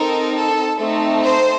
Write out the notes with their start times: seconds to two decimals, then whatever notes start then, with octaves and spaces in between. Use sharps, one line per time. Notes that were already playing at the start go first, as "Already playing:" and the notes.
Already playing: C4 D#4 A4 A#4
0.34 A4
0.79 A3 C4 D#4 A4
1.25 C5